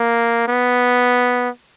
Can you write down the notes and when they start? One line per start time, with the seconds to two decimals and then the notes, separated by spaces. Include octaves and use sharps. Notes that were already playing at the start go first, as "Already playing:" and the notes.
Already playing: A#3
0.48 B3